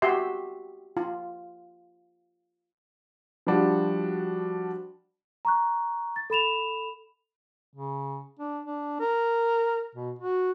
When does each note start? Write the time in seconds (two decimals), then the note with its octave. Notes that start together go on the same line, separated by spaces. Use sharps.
0.02 F#4 G4 E5 C6
0.97 F4
3.47 F3 G3 D4 F#4
5.45 A#5 C#6 F#6
6.16 A6
6.30 A4 B5 E7 F7
7.73 C#3
8.39 D4
8.65 D4
9.00 A#4
9.95 B2
10.19 F#4